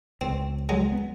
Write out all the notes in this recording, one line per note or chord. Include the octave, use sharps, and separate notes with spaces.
C#2 C4
F#3 G#3
B3